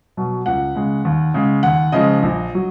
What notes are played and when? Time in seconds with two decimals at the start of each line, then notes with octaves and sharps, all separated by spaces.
0.17 B2 F#3
0.46 C#2 F#5
0.75 C#3 G#3
1.05 D#2
1.34 C#3 G#3
1.63 D#2 F#5
1.92 C#3 F3 G#3 D#5
2.23 A#1
2.55 F#3